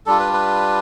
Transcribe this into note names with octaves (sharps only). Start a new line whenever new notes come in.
G3 D4 F4 A4
B4
B4